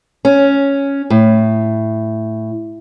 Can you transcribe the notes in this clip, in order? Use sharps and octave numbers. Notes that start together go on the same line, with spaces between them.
C#4
A2